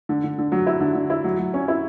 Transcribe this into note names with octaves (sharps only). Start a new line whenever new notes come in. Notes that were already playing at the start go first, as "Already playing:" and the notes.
D3
D3
D3
F#3
E4
D3
D3
E4
F#3
F#3
C#4
E4